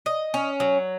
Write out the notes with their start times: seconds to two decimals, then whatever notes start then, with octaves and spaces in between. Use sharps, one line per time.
0.06 D#5
0.34 C#4
0.60 F#3